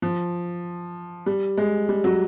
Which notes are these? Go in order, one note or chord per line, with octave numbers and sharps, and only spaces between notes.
F3
G3
G#3
G3
F#3